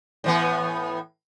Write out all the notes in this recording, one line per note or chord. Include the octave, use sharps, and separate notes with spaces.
A2 E3 B3